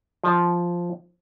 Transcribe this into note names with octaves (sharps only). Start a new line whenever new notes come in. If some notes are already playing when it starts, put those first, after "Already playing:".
F3